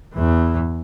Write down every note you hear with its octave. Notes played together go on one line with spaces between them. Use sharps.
E2 E3